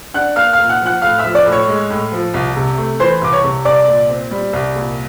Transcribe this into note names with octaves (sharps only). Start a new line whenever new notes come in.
D4 F#5 F#6
A#3 F5 F6
F5 F6
A#2
F#5 F#6
F3
F#5 F#6
A2 F5 F6
E5 E6
F3
D5 D6
A2
C#5 C#6
G#3
A2
F3
C2
C3
A3
E3 C5 C6
C2 D6
C#5 C#6
C3
C2 D5 D6
A#2
C4
G3
C2
A#2